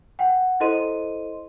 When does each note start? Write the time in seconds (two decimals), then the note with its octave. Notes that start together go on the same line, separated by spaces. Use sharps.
0.19 F#5 G5
0.60 E4 A4 C5 D#5 C6 D#7